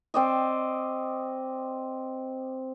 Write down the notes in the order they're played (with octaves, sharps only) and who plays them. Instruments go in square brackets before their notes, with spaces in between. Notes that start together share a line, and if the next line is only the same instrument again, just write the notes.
[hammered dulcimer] C4 D5 D#5